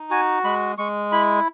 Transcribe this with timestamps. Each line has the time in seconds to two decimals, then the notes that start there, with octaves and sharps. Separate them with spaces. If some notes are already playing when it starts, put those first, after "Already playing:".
Already playing: D#4
0.11 F#4 G#5
0.44 G#3 B5
0.78 G#3 C#6
1.12 E4 B5